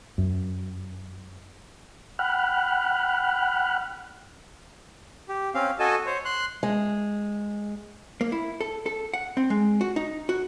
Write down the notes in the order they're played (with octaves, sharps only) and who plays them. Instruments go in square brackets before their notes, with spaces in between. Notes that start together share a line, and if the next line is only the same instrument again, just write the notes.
[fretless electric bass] F#2
[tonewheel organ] F#5 G5 B5 F6 F#6
[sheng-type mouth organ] G4
C4 C#4 F5
F#4 A4 D#5 G#5 A5
C5 C#5
C6 F#6
[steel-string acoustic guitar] G#3
[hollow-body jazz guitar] A#3
E4
A4
A4
F#5
C4
G#3
F#4
D#4
F#4